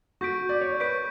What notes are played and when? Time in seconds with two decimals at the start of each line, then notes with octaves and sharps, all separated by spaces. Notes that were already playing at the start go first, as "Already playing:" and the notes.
0.21 F#4 C#6 G6 B6 D7
0.49 D5
0.61 C#5
0.80 B4 C#6 G6 B6 D7